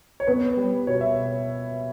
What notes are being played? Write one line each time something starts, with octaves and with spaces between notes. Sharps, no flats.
C#5
B3 B4
G3
B2 C#5
E5